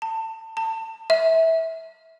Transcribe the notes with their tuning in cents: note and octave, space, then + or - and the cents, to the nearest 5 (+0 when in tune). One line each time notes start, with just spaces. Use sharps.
A5 +25
A5 +30
E5 -20